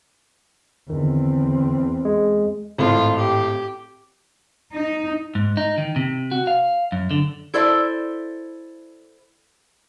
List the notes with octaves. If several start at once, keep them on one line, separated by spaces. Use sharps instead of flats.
E2 D3 D#3 C4
G#3
G#1 A2 F4
G4
D#4
G#2
D#4
D#3
C3
F#4
F5
F#2
D3
E4 A4 C5 D5 E5